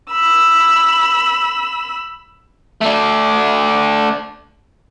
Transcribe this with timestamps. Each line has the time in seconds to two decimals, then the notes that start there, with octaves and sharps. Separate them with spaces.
0.12 B5 E6
2.81 A3 D4